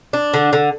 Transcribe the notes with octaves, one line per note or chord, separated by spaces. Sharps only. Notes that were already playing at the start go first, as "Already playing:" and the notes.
D4
D3
D3